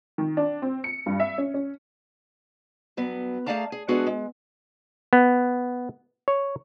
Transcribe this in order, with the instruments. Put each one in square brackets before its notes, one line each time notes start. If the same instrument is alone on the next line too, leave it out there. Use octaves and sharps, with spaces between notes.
[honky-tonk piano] D#3
D4
C4
C#7
G2
E5
C#4
C#4
[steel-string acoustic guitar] G2 F#3 B3
A3 G#4 D5 F5 A5 A#5
G#4
G#3 B3 D4 F#4 G#4 A4
G#3
[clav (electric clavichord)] B3
C#5